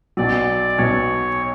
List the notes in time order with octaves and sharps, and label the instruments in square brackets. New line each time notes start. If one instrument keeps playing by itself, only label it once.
[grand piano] B1 B2 F#3 [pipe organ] D5
[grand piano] B1 B2 F#3 [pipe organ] C#5